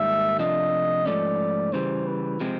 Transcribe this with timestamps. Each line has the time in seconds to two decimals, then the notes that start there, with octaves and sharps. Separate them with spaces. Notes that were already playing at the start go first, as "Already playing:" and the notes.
Already playing: G#2 D#3 G3 A#3 E5
0.39 C3 F3 A3 D4 F4 D#5
1.06 G#2 F3 A3 C#4 D5
1.73 C#3 E3 G3 C5
2.07 B4
2.40 C3 F3 G#3 C4